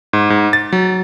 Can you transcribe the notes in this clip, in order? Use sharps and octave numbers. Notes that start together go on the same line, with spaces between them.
G#2
G#2
A6
F#3